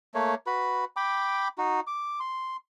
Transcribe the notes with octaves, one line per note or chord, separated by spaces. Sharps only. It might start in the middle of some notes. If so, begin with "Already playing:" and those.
A3 A#3 C#5
F#4 B4 B5
G5 B5 D6
D#4 F#4
D6
C6